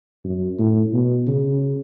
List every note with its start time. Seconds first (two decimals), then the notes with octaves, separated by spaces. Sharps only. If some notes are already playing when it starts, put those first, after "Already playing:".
0.24 F#2
0.59 A2
0.93 B2
1.28 C#3